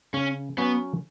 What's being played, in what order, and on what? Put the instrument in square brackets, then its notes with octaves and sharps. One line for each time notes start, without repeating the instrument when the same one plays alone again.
[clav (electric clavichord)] C#3 [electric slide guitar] C#4
[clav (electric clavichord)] F#3 C#4 F#4 C#5 [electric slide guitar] B3